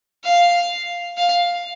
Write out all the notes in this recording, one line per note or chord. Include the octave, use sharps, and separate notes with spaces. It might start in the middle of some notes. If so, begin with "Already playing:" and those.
F5
F5